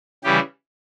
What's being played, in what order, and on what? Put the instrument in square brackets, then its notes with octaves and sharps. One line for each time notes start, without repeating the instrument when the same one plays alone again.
[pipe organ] C#3 E3 G3 G4